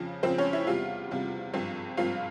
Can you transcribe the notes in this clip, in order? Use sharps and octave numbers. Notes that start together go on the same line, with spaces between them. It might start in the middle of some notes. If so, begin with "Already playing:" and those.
Already playing: F2 C#3 F3
F2 C#3 F3 C4 C5
C#4 C#5
E4 E5
E2 C3 G3 F4 F5
E2 C3 G3
G#1 G2 F3 C4
G#1 G2 F3 C4 F4 F5